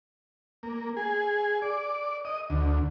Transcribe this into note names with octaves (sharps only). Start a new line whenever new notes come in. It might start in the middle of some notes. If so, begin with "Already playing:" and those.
A#3
G#4
D5
D#5
D2